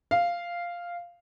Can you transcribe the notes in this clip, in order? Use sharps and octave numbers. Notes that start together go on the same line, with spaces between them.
F5